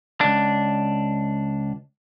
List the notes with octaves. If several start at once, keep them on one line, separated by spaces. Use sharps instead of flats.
C#2 D4